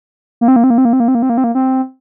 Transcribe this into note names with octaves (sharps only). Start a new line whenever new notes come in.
A#3
C4
A#3
C4
A#3
C4
A#3
C4
A#3
C4
A#3
C4
A#3
C4
A#3
C4